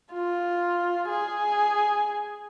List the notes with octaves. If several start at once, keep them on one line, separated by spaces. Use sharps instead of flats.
F4
G#4